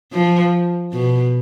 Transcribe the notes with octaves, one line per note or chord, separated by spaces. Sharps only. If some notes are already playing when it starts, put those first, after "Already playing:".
F3
B2